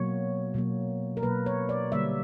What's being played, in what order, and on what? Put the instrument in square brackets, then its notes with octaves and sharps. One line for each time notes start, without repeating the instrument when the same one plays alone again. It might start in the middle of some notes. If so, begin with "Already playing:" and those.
Already playing: [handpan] B2 F#3 A#3 C#5
B2 F#3 A#3
A#4
B2 F#3 A#3 B4
C#5
D5
D3 G3 A#3 E5